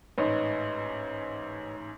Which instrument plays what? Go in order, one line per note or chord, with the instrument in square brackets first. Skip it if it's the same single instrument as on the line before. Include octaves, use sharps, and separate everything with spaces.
[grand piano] A1 G#2 [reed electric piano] B4 C#5 D#5